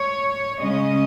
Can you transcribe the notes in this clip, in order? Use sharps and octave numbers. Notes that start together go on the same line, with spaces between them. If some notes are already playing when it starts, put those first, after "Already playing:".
Already playing: C#5
C#3 G#3 C#4 D#5